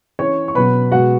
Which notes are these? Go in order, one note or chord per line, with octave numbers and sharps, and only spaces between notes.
E3 C#4 C#5 C#6
C#6
B2 F#3 B3 B4 B5
B2 G#3 B3 F#4 F#5